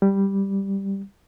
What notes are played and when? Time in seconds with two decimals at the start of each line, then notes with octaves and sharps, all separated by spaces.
0.02 G3